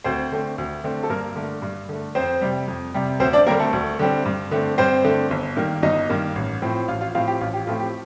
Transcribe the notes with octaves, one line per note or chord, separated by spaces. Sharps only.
D2 C4 C5
D3 A3 C4
D2
D3 A3 C4
A4
G2 A#3 A#4
D3 A3
G2
D3 A3
F2 C4 C5
C3 G3
F2
C3 G3
D2 C4 C5
D4 D5
D3 G3 A#3 C4 A#4
A3 A4
D2
D3 G3 C4
G2
D3 A3 C4
G2 C4 C5
D3 A3 C4
G1
G2 D#3 A#3
G1 D#4 D#5
G2 D#3 A#3
A1
A2 F3 C4
A1 F4 F5
F4 F5
A2 F3 C4 F4 F5
G4
A1 F4
G4
A2 F3 A3 C4 F4
G4